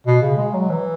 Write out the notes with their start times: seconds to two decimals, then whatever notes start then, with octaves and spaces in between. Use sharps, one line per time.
0.06 B2
0.22 C#3
0.37 G#3
0.54 F#3
0.70 E3